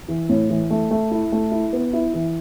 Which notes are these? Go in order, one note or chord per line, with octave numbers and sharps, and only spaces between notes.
E3
A2
E3
A3
A3
E4
A3
E4
B3
E4
E3